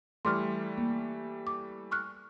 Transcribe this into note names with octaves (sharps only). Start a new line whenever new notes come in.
E3 G3 A3 C6 D6 F6
A#3
D6
C#6 F6 F#6